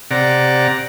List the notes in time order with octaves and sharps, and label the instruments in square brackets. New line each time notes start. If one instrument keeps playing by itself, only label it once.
[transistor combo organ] C3 D5 F#5 A#5